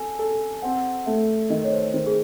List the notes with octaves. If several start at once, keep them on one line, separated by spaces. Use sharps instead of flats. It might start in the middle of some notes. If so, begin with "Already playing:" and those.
Already playing: A4 G#5
A4
C4 F#5
A3 E5
D#3 D#5
C#5
C5
D#3 C5
G#4